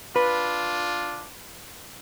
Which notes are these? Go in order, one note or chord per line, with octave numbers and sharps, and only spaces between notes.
D4 F4 B4